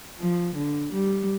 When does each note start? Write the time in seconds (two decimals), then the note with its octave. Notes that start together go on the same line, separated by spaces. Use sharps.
0.20 F3
0.56 D3
0.93 G3